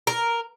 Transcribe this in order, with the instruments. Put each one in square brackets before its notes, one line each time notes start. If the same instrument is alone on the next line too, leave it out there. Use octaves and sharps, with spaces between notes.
[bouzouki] A#4